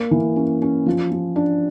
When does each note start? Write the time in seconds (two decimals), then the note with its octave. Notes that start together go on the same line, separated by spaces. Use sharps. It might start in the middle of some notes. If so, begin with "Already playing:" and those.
Already playing: A#3
0.11 E3
0.36 C#4
0.62 C#4
0.86 F3
1.12 F3
1.36 D4